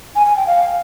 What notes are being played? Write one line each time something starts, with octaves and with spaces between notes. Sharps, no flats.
G#5
G#5
G5
F5